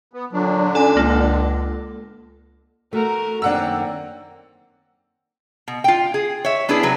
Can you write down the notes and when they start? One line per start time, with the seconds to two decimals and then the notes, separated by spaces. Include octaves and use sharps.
0.13 B3
0.33 A#2 D3 F#3 D4
0.75 C#4 A4 G#5
0.97 C#2 A#3 A4
2.93 A3 F#4 A#4
3.42 F#2 D#3 A#3 C4 D4 F#5 E6
5.68 B2
5.84 F4 G5
6.14 G#4
6.45 C#5 E5
6.69 B3 D4 E4 G#4 B4
6.83 C3 F#3 B4